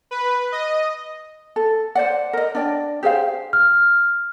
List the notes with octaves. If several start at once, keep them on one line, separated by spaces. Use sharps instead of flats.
B4
D#5
A4
C5 D5 F#5
A#4 D#5
D4 D5 G5
G4 G#4 C5 F5
F6